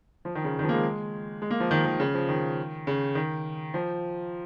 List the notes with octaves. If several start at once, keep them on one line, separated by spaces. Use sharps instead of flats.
F3
D#3
C#3
D#3
F3
A#3
G#3
G#3
A#3
F3
D#3
D#3
C#3
F3
D#3
C#3
D#3
F3